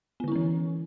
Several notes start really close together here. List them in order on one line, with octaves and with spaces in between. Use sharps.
B3 D3 E4 C#4 E3